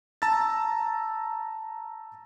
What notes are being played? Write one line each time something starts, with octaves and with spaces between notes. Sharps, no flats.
A5 A#5 E6 A6